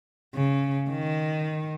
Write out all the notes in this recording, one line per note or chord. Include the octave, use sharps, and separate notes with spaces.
C#3
D#3